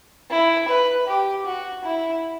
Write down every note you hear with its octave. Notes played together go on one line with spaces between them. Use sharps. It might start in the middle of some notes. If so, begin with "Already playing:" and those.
E4
B4
G4
F#4
E4